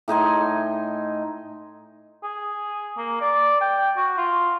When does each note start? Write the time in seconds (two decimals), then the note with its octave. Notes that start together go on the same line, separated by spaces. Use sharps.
0.08 A2 D#4 G#5 C6
2.23 G#4
2.98 A#3
3.21 D5
3.61 G5
3.97 F#4
4.18 F4